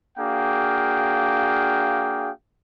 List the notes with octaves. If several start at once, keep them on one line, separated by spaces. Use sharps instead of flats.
A#3 D4 F#4 G#4 F5 G5